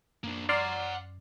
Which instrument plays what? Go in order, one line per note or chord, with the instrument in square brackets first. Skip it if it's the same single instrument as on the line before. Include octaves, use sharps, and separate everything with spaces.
[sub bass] F#2 [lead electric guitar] A#3 D4
[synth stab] D5 C6 F6 [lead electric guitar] F#5 A#5